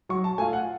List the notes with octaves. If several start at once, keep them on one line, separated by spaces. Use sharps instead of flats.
F#3 C#6
A5
A3 F4 G#5
F#5